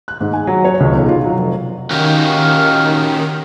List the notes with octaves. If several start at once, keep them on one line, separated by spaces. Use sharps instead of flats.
F#6
G#2
G#5
F#3
C#5
C#2
B1
F4
F#3
F1
D#3 C#4 F#4 G4 F5